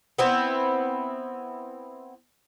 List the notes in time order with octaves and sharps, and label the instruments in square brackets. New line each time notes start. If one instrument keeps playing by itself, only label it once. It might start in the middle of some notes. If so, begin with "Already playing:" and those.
[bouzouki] B3 C4 E4